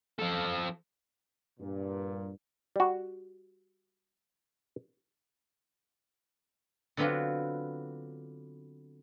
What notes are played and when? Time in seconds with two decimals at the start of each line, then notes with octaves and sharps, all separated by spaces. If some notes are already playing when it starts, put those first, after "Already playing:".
0.19 F3 A4
1.60 G2 A#2
2.76 G3 F#4
6.97 D3 F#3 B3 C4 D4 F4